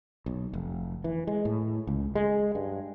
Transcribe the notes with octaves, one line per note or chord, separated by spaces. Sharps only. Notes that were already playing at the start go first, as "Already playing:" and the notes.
B1
F1
E3
G#3
A2
C#2
G#3
G2